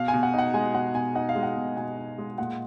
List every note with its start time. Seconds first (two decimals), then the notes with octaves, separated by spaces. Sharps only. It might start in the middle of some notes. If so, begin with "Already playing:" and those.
Already playing: B2 F5
0.08 G#5
0.14 B2
0.23 F#5
0.34 D#4 F#5
0.54 G#3 G#5
0.74 B2 F#5
0.94 B2 G#5
1.15 D#4 F#5
1.29 F5
1.36 G#3
1.43 F#5
1.56 B2
1.77 B2 G#5
1.98 D#4
2.18 G#3
2.38 A#2 F#5